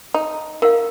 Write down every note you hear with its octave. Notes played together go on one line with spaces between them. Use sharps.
D#4
D#3 A#4 F5